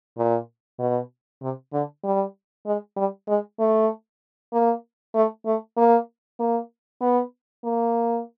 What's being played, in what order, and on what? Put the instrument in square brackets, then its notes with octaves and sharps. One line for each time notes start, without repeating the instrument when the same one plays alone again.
[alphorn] A#2
B2
C3
D3
G3
G#3
G3
G#3
A3
A#3
A3
A3
A#3
A#3
B3
A#3